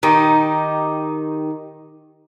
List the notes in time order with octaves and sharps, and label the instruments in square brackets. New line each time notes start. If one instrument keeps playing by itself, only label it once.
[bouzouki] D#3 D#4 G4